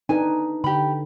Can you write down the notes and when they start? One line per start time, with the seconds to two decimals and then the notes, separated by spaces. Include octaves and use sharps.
0.09 D4 D#4 B4 G#5
0.64 D3 G4 B5